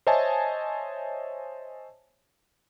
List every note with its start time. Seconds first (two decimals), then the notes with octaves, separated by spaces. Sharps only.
0.07 C5 C#5 D#5 E5 G#5 A5